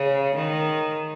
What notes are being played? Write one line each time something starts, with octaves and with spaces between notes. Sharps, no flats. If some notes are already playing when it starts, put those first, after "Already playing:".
Already playing: C#3
D#3